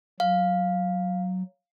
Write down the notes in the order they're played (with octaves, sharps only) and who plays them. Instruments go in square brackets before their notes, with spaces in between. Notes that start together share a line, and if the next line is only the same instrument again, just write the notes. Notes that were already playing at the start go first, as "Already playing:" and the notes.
[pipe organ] F#3 [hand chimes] F5